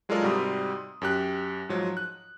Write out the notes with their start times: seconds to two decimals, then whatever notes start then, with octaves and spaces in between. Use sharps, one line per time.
0.09 F#3 G#3 F4 A4 A#4 D5
0.22 G#2 C3 G3 F#4 C6 D#6
1.02 F#2 G4 F#6
1.69 G#2 F3 F#3
1.97 F#6